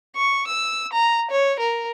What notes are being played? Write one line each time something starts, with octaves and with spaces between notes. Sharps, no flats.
C#6
E6
A#5
C#5
A#4